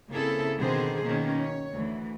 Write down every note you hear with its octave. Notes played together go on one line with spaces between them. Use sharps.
C#3 A#3 C4 E4 G#4 A4
B2 D3 D#3 C4 G#4 C5
B2 D#3 A#3 C#4
C#5
D2 E3